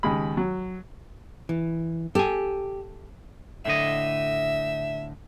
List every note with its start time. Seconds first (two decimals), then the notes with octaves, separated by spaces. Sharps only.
0.03 D#2 C#3 G#3 B5
0.37 F#3
1.49 E3
2.15 G4 A4 G#5
3.65 A2 D3 D#5 E5